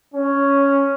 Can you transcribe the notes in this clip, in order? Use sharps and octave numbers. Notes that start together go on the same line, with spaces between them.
C#4